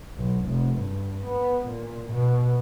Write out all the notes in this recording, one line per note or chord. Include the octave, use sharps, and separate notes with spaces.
B1
F1
G2
B3
A#2
B2